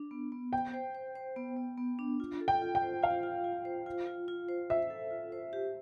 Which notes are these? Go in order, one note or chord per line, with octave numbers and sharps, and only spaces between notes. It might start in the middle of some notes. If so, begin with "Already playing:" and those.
Already playing: D4
B3
B3
C5 G5
C5
C5
C5
B3
B3
B3
D4
F4
A4
G5
F4
G5
C5
F4 F5
F4
F4
C5
F4
F4
F4
C5
C5 E5
A4
F4
C5
G4